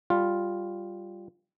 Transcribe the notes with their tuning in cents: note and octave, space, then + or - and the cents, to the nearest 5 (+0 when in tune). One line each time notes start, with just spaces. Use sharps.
G3 +0 F4 +0